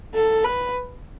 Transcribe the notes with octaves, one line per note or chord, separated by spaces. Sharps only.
A4
B4